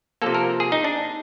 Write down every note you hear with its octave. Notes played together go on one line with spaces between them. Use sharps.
C3 F3 A#3 A4
A#4
G#4
D#4
D4